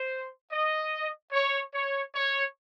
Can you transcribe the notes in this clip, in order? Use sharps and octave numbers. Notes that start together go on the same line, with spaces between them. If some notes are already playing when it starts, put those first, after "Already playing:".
Already playing: C5
D#5
C#5
C#5
C#5